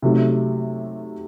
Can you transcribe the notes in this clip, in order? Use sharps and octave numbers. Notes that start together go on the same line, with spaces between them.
C3 F#3 A3 D#4